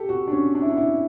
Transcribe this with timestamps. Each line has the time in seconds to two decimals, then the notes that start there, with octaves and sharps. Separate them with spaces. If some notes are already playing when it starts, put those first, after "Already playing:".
Already playing: G4 A4
0.09 F#4
0.28 D4
0.32 C#4
0.55 D4
0.62 E4
0.70 D4
0.77 E4